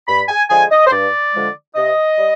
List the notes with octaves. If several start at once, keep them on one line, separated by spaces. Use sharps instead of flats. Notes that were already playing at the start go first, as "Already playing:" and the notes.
G2 B5
G#5
D3 F3 G#3 G#5
D#5
C5
G2 D5
D3 F3 G#3
C3 D#5
G3